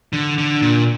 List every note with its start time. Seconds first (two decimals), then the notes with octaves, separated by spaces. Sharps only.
0.13 D3
0.38 D3
0.62 A#2